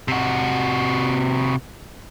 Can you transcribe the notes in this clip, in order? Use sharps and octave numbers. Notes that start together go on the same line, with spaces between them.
C3 F#4